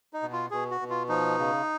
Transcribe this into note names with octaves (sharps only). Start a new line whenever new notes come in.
D#4
B2
F4
B2 G#4
F#4
B2
F4
F3 D#4
C#3